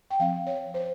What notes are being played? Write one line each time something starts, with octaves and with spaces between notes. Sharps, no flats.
G5
F3 C4 F5
C#5
C5